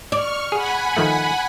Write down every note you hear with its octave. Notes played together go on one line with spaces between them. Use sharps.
D5 C#6 F6
G#4 F#5 G#5 B5
D#3 F3 A3